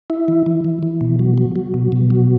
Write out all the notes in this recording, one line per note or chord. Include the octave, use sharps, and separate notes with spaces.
E4
E3
E3
E3
E3
B2
F#3
F#3
F#3
B2
B2
F#3